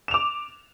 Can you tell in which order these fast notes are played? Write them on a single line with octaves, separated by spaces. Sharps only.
E7 F7 D6